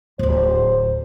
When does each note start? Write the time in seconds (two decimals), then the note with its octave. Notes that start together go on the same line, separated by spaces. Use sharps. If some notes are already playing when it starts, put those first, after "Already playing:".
0.19 D1 G#1 C5